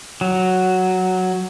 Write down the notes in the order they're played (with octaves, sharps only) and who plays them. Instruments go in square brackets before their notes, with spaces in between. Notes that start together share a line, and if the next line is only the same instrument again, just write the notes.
[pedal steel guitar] F#3